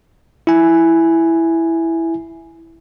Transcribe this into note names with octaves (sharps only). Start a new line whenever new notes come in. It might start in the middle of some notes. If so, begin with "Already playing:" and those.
E4 G#5